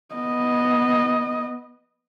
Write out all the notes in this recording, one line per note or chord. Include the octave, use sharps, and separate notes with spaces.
B3 D#5